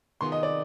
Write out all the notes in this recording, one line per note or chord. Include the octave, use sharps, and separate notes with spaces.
C3 D#3 B3 F4 G#4 C6
D#5
D5